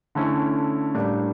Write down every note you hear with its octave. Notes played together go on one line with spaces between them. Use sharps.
D3 A3 C#4 E4
A2 G3 A#3 D4